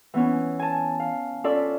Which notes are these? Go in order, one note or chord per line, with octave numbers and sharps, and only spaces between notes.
E3 B3 C#4
G#5 A5
F5
C#4 F4 A4 D5 E5